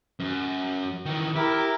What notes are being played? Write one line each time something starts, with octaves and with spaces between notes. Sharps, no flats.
F#2
D#3 E3
E4 G4 A#4